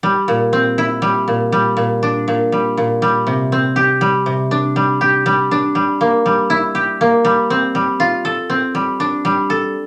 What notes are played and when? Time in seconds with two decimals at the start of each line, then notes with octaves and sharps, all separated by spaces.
0.03 G3
0.28 A#2
0.53 C4
0.78 E4
1.02 G3
1.28 A#2
1.52 G3
1.77 A#2
2.03 D4
2.28 A#2
2.52 G3
2.77 A#2
3.02 G3
3.27 C3
3.52 C4
3.76 G4
4.01 G3
4.26 C3
4.51 D4
4.76 G3
5.01 G4
5.26 G3
5.51 D4
5.75 G3
6.01 A#3
6.26 G3
6.50 E4
6.75 G4
7.01 A#3
7.25 G3
7.50 C4
7.75 G3
8.00 F4
8.25 A4
8.50 C4
8.75 G3
9.00 D4
9.25 G3
9.50 A4